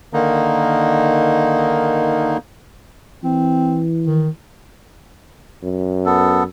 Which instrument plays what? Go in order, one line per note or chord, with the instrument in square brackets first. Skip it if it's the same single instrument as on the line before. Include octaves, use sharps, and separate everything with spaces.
[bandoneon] D3 D#3 A#3 D#4
[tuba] E3 [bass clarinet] C4
[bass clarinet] D#3
[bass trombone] F#2
[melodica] B3 A4